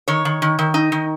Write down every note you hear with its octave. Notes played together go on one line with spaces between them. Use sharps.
D#3 C#5
D#3
D#3
D#3
D#4
D#3